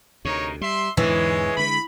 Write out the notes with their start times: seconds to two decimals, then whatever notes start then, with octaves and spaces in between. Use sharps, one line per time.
0.25 D2 C3 D#4 A#4 C#5
0.61 G3 E5 C6
0.97 E2 G#2 D3 E3 G#3 G#4 C#5
1.57 D3 G#3 B5